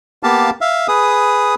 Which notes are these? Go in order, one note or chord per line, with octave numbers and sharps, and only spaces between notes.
A#3 B3 G4 F5 A5
E5 F5
G#4 B4 D#6